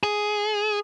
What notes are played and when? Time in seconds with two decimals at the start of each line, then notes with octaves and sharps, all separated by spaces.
0.03 G#4